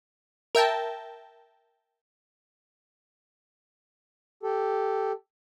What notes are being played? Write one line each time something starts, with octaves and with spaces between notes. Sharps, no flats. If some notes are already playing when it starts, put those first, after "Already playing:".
A#4 E5 G5 A5
G4 A4